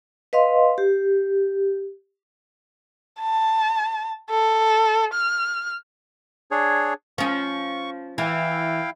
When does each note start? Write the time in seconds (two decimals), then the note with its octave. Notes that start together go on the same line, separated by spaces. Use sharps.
0.33 B4 D#5 F5 C6
0.78 G4
3.20 A5
4.30 A4
5.14 F6
6.51 D4 G#4 C#5
7.18 F3 C#4 C#6
8.18 E3 E4 F5 G5